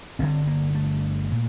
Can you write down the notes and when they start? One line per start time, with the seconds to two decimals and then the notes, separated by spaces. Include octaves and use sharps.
0.19 G1 G2 D3 C4
0.47 A#3
0.75 A3
1.32 A#2